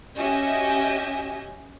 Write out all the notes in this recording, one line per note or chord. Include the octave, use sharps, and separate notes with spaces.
C#4 F#4 G4 D#5 E5 G#5